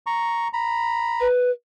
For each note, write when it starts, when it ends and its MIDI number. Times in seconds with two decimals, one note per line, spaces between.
0.07 0.48 82
0.07 0.48 85
0.53 1.27 82
0.53 1.27 83
1.20 1.51 71